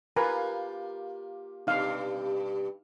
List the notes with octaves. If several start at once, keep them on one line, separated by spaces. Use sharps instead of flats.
A#3 F4 G4 A#4 B4 G#5
G2 B2 G3 D#4 F5